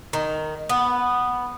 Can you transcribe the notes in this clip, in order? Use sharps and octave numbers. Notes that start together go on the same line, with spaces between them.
D#3
B3